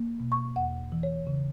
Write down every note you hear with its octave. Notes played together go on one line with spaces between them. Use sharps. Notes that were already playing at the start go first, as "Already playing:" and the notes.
Already playing: A#3
B2
C#6
E2 F#5
E3
C#5
C#3